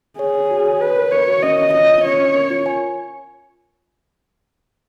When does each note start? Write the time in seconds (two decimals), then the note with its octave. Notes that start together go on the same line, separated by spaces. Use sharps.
0.19 G#4 C#5
0.35 C#5
0.51 F#4
0.66 C#5
0.81 B4 C#5
0.97 A#4
1.12 A#4 C#5
1.27 F#4
1.43 C#4 D#5
1.58 C#5
1.73 F4 D#5
1.89 F4
2.05 C#4 C#5
2.20 C#4
2.35 A#4
2.50 F4
2.66 G#5